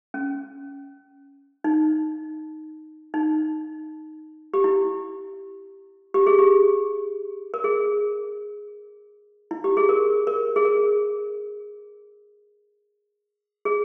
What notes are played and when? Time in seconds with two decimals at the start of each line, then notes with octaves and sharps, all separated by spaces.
0.14 C#4
1.64 D#4
3.14 D#4
4.54 G4
4.64 E4
6.14 G4
6.27 G#4
6.39 G4
7.54 A#4
7.64 G#4
9.51 E4
9.64 G4
9.77 G#4
9.89 A#4
10.27 A#4
10.56 G#4
10.65 A#4
13.65 G#4